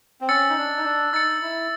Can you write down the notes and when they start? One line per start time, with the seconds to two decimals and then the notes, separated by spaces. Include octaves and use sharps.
0.21 C4
0.29 C#4 E6 A6 C#7
0.49 D#4
0.57 D4
0.77 D#4
0.85 D4
1.13 D#4 E6 A6 C#7
1.42 E4